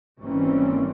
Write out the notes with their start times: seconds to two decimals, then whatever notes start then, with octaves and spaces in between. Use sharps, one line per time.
0.20 G#1 E3 G3 A#3 C4 C#4